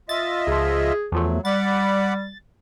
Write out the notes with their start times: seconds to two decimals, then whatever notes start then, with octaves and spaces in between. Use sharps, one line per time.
0.09 F4 D#5 E5 A6
0.47 C#2 F3 G#4
1.12 E2 F3 F#3 A3
1.45 G3 D5 F#5 B5 A6